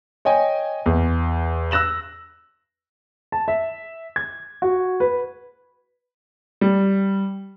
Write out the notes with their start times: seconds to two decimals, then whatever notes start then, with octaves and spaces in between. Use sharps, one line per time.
0.25 C#5 D#5 G5 G#5
0.86 E2
1.71 E6 F#6 A#6 E7 F#7
3.32 A5
3.48 E5
4.16 G#6
4.62 F#4
5.00 B4
6.61 G3